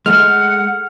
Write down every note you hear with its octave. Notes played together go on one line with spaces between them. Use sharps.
G#3 A3 F#5 F6